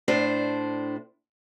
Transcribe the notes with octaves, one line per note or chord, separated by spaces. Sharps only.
A2 D4 C5